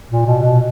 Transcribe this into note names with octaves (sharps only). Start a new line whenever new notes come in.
A#2
B2
B2